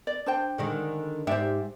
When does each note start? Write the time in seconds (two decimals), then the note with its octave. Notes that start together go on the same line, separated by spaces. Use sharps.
0.07 D5
0.26 D4 C5 G5
0.58 D3 D#3 G#3
1.27 G#2 G4 C5 D5 E5